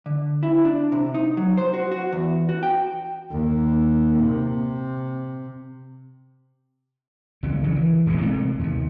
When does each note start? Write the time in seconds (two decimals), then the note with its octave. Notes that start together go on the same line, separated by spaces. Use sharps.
0.06 D3
0.43 E4
0.65 D4
0.92 C3
1.14 D#4
1.37 F#3
1.57 C5
1.74 F#4
1.91 F#4
2.12 E2
2.49 F#4
2.63 G5
3.31 D#2
4.20 C3
7.43 G#1 C#2 C#3 G3
7.63 C#3 E3 F#3
7.76 E3
8.06 E1 A1 E2 G#2
8.21 C3 G#3 A3
8.59 D#2 C3